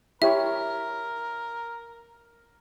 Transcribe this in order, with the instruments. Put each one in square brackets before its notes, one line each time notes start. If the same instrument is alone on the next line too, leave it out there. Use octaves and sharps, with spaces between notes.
[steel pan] E4 G4 C#5 [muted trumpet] A#4 [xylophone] E5